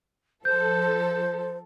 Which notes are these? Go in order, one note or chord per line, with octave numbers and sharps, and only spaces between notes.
F3 A4 C5 G6